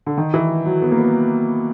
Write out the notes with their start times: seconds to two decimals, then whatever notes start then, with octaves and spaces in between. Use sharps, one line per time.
0.06 D3
0.18 D#3
0.34 E3
0.66 F#3
0.82 B3
0.91 A#3
0.98 B3